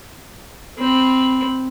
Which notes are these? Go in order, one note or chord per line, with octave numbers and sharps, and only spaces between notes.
C4 B5